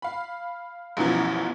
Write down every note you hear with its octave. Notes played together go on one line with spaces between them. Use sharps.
F5 B5
A1 F#2 B2 E3 F3